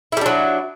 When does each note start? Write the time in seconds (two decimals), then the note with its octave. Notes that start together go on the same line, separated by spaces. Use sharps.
0.12 E4
0.17 G3
0.21 D4
0.26 F#3